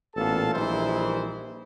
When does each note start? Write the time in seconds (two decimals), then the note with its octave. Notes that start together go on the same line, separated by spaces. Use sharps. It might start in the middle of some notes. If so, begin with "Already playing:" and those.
0.16 A1 A#2 B3 A4 F5 A5
0.54 A#1 E3 G3 D#4 E4 C5